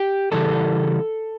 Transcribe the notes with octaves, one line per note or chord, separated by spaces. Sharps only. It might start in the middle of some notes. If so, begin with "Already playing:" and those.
Already playing: G4
C#3 E3 G3 A4